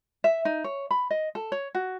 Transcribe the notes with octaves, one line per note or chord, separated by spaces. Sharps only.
E5
D#4
C#5
B5
D#5
A4
C#5
F#4